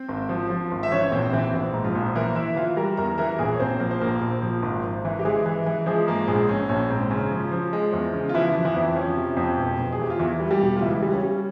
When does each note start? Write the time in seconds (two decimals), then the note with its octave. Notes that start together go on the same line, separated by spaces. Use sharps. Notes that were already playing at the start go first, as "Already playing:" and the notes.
Already playing: C4 C5
0.08 G#1
0.29 F3
0.50 F3
0.71 G#1
0.83 E5
0.92 E3 C#4 C#5
1.12 A#1 C4 C5
1.32 E3 C4 C5
1.53 A#1
1.74 G#2
1.84 F3 F4
1.95 A#1
2.15 E3 A#3 A#4
2.35 E3 E4 E5
2.56 E3 F4 F5
2.77 G3 A#4 A#5
2.97 E2 A#4 A#5
3.18 E3 A#4 A#5
3.31 A#5
3.39 A#1 G#4 G#5
3.54 C#5
3.60 A#1 C4 C5
3.80 F3 A#3 A#4
3.91 C5
4.01 A#1 A#3 A#4
4.21 A#1
4.42 F3
4.62 G#1
4.84 G#1
5.05 E3
5.19 G4
5.25 E3 G#3 G#4
5.46 E3
5.66 E3
5.86 F3 G#3 G#4
6.07 G#2 A#3 A#4
6.27 A#1 G#3 G#4
6.49 A#1 C#4
6.69 A#1 C#4
6.90 G#2 C4
7.10 C#3 C#4
7.31 F3
7.52 F3
7.73 G#3
7.93 E2
8.13 C#3
8.29 F4
8.34 E3 F3 E4
8.55 F3
8.65 E3 E4
8.76 F2
8.88 E4
8.95 F3 C#4
9.17 C3
9.37 F2
9.58 E1
9.79 E1
9.92 G#4
9.99 E2 G4
10.10 F4
10.19 E2 E3 E4
10.40 G3
10.51 G3 G4
10.62 E1
10.76 F4
10.81 C#2 E3 E4
11.02 G3
11.13 C#4
11.23 G3